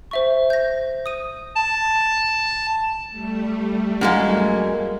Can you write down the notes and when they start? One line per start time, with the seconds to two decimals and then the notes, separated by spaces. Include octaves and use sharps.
0.11 C5 E5 C#6
0.50 G6 A#6
1.06 D#6 D#7
1.56 A5
3.10 G3 A3
4.01 F#2 G#3 A#3